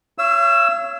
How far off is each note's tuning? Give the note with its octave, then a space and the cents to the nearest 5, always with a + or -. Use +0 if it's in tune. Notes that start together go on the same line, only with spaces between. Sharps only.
C#5 +0 F5 -45 E6 +0